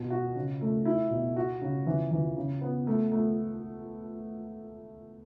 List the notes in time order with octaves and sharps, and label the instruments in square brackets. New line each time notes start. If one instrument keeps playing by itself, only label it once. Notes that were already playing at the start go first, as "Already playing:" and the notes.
Already playing: [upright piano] B2
F#4
C#3
A3
E4
B2
F#4
C#3
E3
E3
C#3
B3
A3
A3